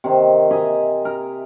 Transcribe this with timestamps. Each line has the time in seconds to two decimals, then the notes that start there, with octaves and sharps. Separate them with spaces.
0.04 C3 D#3
0.51 D#5 E5 G#5 A#5
1.05 A#4